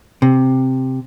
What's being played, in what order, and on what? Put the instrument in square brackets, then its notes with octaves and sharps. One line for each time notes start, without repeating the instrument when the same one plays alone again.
[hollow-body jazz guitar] C3